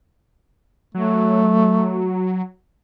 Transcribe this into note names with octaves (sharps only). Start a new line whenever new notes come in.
F#3 A3